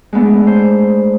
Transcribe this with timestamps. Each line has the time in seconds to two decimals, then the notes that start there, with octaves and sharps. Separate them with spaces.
0.13 G#3 A3 B3 D4
0.47 C5